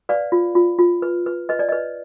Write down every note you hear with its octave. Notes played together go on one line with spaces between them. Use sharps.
B4 D5 F5
F4
F4
F4
B4
B4
B4 D#5
D5
B4 D#5